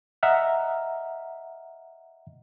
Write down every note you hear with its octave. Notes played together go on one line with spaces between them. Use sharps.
D#5 E5 F#5 A#5 F6